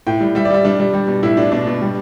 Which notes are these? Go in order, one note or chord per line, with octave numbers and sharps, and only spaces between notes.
A2 G5
G3
G3 E5
D5
G3 E5
G3 D4
G3
G3
B2
A2 E4
A2 D4
B2 D4
B2
G3